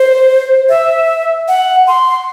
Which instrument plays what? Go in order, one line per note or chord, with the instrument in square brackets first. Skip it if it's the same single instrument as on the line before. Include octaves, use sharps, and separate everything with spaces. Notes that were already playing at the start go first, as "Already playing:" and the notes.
Already playing: [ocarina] C5
E5
F#5
C6